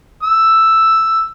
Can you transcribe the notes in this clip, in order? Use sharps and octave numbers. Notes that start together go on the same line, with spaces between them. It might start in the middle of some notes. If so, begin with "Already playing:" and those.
E6